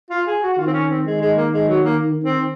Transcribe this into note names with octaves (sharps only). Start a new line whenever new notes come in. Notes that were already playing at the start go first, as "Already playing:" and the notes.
F4
G#4
F#4
F#4
D#3 F4
C4
C#4
C4
D#3 G#3
G#3
A#3
G#3
F#3
A#3
C4